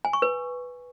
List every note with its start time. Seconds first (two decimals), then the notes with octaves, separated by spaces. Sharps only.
0.05 G#5
0.13 C#6
0.22 B4